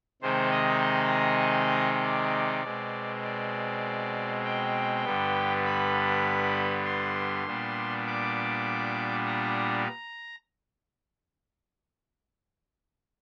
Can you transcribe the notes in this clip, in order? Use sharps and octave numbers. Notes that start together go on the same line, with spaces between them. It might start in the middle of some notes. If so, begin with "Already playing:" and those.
C3 D#3 G#3 C4 D#4 C5
D#5
D#5
D5
B2 G#3 C4
D5
G5
G2 D3 G3 B3
B5
C6
A#2 G3 B3 D4
D6
A#5